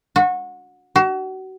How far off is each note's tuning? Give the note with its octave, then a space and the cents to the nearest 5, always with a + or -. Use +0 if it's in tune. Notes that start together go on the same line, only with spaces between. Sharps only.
F#4 -25
F#4 +35